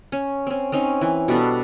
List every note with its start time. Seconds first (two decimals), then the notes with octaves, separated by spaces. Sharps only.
0.12 C#4
0.47 C4 C#4
0.72 C4 C#4 D#4
1.01 E3
1.28 B2 G3 D4 A4